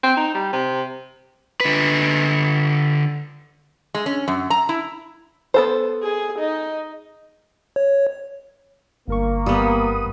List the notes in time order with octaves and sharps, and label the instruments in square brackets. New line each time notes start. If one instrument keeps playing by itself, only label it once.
[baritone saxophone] C4
D#4
G3
C3
[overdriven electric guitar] D3 B4
[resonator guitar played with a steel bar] G#3
C#4
F#2
A#5
E4
[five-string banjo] B3 A4 C5
[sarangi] G#4
D#4
[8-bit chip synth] C#5
[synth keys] G1 A#4 C#6 [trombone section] A#3
[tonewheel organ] G2 D#6 [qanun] G3 B3